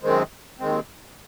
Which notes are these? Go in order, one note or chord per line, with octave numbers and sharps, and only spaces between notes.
F#2 D#3 G#3 C4
D#2 D#3 G#3 C4